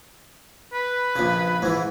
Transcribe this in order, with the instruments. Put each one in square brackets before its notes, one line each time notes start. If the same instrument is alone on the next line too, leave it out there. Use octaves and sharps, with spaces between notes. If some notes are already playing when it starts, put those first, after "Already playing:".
[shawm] B4
[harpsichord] A#1 C#3
G#2 E3